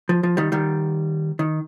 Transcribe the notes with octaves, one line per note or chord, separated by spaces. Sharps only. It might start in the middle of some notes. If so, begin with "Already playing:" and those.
F3
F3
D#3 G3
D#3 G3
D#3